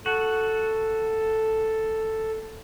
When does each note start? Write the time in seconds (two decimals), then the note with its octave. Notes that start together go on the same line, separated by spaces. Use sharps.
0.06 F#4 A4